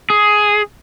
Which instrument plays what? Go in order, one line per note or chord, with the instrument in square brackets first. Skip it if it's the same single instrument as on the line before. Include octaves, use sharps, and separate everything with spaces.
[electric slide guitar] G#4